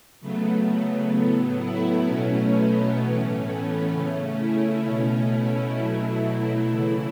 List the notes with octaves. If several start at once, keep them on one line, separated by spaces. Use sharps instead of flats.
C#3 F#3 A3 B3
A2 F#3 A3 B3
E4
B2 F#3 A3 C#4
B3
A2 E3 A3 C#4
B3
C#3 A3 C#4
E4
B2 A3 C#4
E4
B2 F#3 A3 E4
C#3 E3 A3